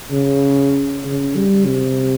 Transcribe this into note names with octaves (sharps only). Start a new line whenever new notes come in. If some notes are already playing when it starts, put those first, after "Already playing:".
C#3
C#3
G3
C3